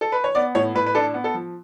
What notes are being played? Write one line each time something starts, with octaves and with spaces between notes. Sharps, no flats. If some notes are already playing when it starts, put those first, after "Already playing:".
A4
B4
C#5
B3 D5
A2 C#5
A2 B4
B4
D4 A4
B3
A4
F3